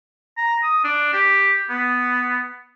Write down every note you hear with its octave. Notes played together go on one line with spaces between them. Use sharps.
A#5
D#6
D4
G4
B3